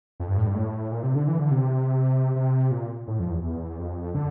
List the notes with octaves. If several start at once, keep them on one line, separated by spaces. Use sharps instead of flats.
F2
G2
A2
G2
A2
A#2
C3
D3
E3
D3
C3
C3
A#2
A2
F2
E2
E2
F2
D3